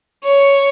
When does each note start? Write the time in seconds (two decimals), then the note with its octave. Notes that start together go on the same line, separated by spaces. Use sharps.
0.24 C#5